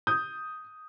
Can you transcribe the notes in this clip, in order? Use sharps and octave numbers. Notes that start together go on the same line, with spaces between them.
D#6 G6